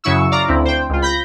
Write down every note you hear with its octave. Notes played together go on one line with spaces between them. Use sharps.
F#2 C#3 F#3 E4 C#6 E6
D5 F5 A#5 D6
D2 C4 E4
C5 G5
C#2 F4
B5 G6 A#6